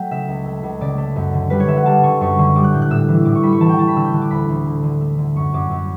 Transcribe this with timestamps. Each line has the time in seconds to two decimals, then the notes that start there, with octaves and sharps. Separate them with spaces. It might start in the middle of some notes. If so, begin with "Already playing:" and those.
Already playing: F#3 A3 G5
0.11 C#3 E5
0.28 C#2
0.46 A3
0.63 C#2
0.81 C#3 D5
0.98 A3
1.16 F#2
1.34 D3
1.50 G3 B4
1.60 C#5
1.67 D3 E5
1.76 F#5
1.86 G3 A5
2.03 D3 C#6
2.21 F#2 C#6
2.39 D3
2.55 G3 D6
2.64 F#6
2.73 A2 G6
2.82 F#6
2.90 A2 E6
3.09 E3
3.25 A2 D6
3.35 C#6
3.43 G3 B5
3.53 C#6
3.60 E3 A5
3.69 G5
3.78 E3 A5
3.88 B5
3.96 D3 E6
4.05 G6
4.13 D3 F#6
4.22 D6
4.31 D2 B5
4.49 D2
4.66 D3
4.83 D3
5.01 A3
5.18 D3
5.36 F#2 C#6
5.53 F#2 D6
5.71 F#2